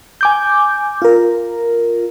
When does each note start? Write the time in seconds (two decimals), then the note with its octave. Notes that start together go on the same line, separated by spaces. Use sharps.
0.21 G#5 D6 G6
1.02 F4 A#4